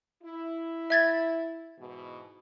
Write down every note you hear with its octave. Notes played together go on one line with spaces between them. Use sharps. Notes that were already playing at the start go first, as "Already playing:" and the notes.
E4
E5 G#6 A6
G#2 B2 E3